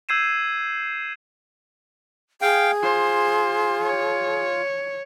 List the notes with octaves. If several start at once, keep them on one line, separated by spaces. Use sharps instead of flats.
E6 G6 G#6 C7 D#7 E7
G#4 F5 G5
F4 C5
C#5